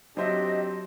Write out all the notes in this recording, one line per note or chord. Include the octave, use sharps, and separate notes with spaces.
F#3 C4 D4 G4 C5 D#5 E5